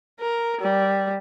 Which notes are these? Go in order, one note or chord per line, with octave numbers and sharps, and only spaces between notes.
A#4
G3